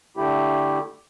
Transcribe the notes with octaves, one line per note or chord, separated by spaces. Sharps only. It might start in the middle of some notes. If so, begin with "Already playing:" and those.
D3 A3 E4 G4